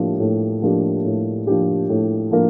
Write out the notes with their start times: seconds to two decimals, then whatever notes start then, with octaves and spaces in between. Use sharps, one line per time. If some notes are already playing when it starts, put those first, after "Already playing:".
Already playing: A2 F3 A#3 D4 G4
0.20 A2
0.62 F3 A#3 D4 G4
1.05 A2
1.47 F3 A#3 D4 G4
1.89 A2
2.31 F3 A#3 D4